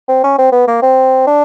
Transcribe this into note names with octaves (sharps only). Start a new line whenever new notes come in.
C4
C#4
C4
B3
A#3
C4
D4